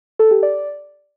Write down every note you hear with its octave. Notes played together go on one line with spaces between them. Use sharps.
A4
G4
D5